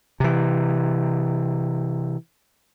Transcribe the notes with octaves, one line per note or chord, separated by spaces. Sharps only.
C3 E3